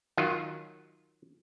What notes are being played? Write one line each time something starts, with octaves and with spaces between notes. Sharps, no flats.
D#3 F#3 F4